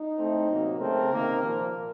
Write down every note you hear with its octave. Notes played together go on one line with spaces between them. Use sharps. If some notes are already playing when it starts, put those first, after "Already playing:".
Already playing: D#4
A2 A3 C4
C3 F#3 A#3
C#3 A3 C4 A#4
C3 D#3 A#3
A#2 F3 A#3